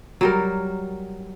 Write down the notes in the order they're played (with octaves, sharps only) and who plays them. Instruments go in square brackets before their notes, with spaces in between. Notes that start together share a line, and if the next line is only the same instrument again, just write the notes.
[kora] F#3 G3 A#4